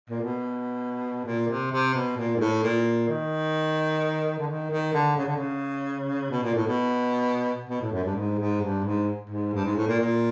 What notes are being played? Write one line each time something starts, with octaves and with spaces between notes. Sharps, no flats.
A#2
B2
A#2
C3
C3
B2
A#2
G#2
A2
A#2
D#3
D3
D#3
D#3
D3
C#3
D3
C#3
B2
A#2
A2
B2
B2
A2
F#2
G2
G#2
G#2
G2
G#2
G#2
G2
G#2
A2
A#2
A#2